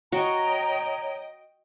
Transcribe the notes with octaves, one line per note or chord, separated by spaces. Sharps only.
F#4 C#5 D#5 G5 A#5